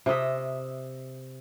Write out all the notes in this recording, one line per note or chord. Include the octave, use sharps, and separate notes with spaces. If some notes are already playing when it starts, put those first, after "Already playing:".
C3 A#4 D#5 E5